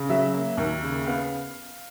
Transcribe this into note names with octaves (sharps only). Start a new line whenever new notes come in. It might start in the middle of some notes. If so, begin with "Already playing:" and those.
Already playing: C#3
F#3 E5
A#3
D#2
C#3
B3 F5